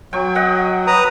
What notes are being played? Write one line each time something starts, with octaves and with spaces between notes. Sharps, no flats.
F#3 G5 C#6
D#5 F#5 G5
B4 A#5 D#6